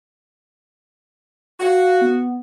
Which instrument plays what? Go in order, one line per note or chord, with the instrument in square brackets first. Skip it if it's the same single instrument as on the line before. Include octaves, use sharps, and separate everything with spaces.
[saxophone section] F#4 [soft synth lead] F5
[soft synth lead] B3